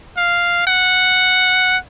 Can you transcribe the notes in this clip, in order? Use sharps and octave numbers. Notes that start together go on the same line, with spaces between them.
F5
F#5